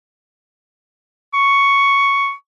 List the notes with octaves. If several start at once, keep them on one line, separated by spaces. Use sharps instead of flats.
C#6